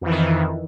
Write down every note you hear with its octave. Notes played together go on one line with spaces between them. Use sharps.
F2 D#3 E3